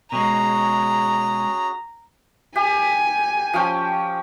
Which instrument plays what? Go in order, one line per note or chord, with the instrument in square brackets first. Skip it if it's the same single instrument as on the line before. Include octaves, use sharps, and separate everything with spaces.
[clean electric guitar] B2 G#3 [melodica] C#4 F#4 G#4 [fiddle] A#5
[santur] G4 [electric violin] G#5
[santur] F3 C#4 G5